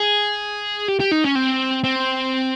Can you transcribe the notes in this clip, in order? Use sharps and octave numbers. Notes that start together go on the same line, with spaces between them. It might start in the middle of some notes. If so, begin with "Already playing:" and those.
Already playing: G#4
G4
G4
D#4
C#4
C4
C4